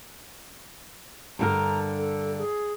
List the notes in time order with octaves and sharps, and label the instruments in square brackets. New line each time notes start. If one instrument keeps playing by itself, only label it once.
[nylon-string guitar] G2 D3 A#4 [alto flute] A#5
[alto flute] A4
G#4